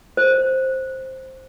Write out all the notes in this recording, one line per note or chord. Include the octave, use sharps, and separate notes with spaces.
C5